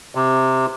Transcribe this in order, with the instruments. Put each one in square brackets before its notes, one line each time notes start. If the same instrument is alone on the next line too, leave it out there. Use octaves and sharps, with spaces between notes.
[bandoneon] C3